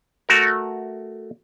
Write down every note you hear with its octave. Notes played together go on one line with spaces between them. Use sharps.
A3 F#4 A#4